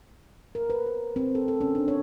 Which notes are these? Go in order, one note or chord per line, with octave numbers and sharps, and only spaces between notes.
A#4
B4
C5
C4
A4
A4
C#4
D4
C#5